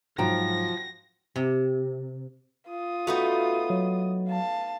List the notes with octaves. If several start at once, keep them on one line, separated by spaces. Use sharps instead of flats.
G#2 F3 F#3 F4 F#4 G5 A#5 A#6
C3
F4 D#6
A3 B3 D#4 F#4
F#3
F5 A5